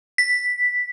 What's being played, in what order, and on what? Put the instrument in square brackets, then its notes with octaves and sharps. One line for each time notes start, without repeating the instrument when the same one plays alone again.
[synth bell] B6